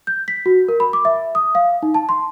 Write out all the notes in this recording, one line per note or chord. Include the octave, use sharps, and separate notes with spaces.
G6
B6
F#4
A#4
B5
D6
E5
D#6
F5
D#4
A5
C6